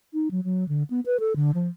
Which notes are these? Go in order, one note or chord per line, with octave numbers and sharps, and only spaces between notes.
D#4
F#3
F#3
D3
B3
B4
A4
D3
F3